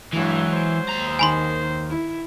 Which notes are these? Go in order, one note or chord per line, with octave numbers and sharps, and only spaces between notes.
G2 E3 F#3 G#3
C5
D#2 A#5
D#3 G#5 B5 C6
E4